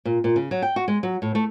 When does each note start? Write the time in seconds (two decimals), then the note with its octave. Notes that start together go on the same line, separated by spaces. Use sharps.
0.05 A#2
0.24 A#2
0.36 C#3
0.51 F#3
0.62 G5
0.76 F#4
0.88 G#3
1.03 F#3
1.22 A2
1.35 A3